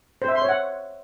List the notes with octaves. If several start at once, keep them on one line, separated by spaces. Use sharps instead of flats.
C5
E5
C6
C#5
F#5